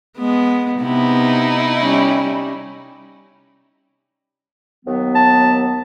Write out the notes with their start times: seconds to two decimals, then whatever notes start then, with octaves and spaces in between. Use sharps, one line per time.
0.18 G#3 B3
0.81 C3 B3 D#4 E4
1.80 G3 C#4
4.85 D#2 F#3 B3
5.15 A5